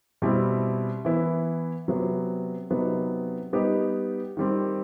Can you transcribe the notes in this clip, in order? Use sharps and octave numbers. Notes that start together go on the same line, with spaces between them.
B2 G3 C4 E4
E3 B3 E4
C3 F#3 B3
C3 F#3 B3 D#4
G3 B3 D#4 G4
D#3 G3 C4